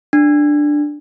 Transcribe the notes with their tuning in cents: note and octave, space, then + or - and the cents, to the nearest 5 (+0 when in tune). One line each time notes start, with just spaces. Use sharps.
D4 +5